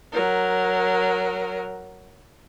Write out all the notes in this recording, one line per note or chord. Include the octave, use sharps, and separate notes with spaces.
F#3 A#4